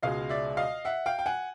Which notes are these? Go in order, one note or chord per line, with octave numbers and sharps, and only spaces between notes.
C#2 B2 G#3 D#5 F5
D5 E5
D#5 F5
E5 F#5
F5 G5
G5
F#5 G#5